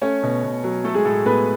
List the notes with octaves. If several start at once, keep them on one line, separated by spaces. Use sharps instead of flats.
A3 C#4 C#5
B2
B2
F#3
A3 A4
G#3 G#4
A2 A3 A4
A2 B3 B4